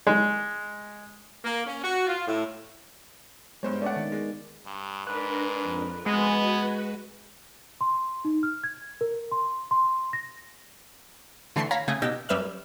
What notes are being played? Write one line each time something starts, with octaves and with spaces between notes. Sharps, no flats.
G#3
A#3
C#4
F#4
F4
A2
G2 G#3 B3 C5 C#5
A3 C#4 D5 F#5
D#3
G#3
G2
G#2 D4 A#4 B4
F2
G#3 B3 F#4 B4 G#5
C6
D#4
F6
G#6
A#4
C6
C6
A#6
D3 E3 A3 C6 C#6
C#5 F5 A#5 B5
C#3 A3 G#4
B2 D#4 G4 E6 A#6
F#2 G3 B4 E5 F5 F6